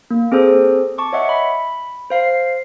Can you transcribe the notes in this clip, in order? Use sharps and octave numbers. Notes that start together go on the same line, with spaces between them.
A#3
C4 G#4 A4 C5
A5 C#6 D6
C#5 D#5 E5 F#5
B5
C5 F5 C7